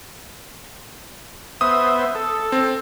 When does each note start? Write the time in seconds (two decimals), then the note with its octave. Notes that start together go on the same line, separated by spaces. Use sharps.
1.61 B3 C5 E5 D#6
2.15 A4
2.52 C4